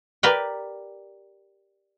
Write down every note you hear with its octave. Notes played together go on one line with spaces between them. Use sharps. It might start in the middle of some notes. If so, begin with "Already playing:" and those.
G4 A#4 B4 D5 G5